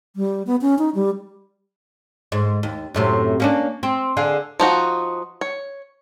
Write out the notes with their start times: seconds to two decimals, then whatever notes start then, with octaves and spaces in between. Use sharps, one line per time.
0.16 G3
0.47 B3
0.62 C#4
0.79 D#4
0.95 G3
2.32 G#2
2.63 D#2
2.94 F#2 A2 C3
3.40 A#3 C#4 D4
3.83 C4
4.17 D3 G#4 F5
4.60 F3 D#4 F#4
5.41 C#5